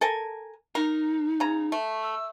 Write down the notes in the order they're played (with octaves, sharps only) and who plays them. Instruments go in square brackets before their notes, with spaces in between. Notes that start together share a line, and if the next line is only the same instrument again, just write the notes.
[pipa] A4 A#4 G#5
[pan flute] D#4 [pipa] A#4
[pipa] C#3 A#5
A3
[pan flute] E6